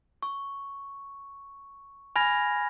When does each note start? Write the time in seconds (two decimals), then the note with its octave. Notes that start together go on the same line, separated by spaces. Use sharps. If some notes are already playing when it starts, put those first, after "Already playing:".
0.23 C#6
2.16 G#5 B5 F6 G#6 A#6